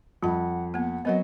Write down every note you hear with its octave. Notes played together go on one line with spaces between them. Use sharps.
F2 G3 F#5 B5
A#3 B3 F#5
F#3 B3 C4 A#4 D#5 F#5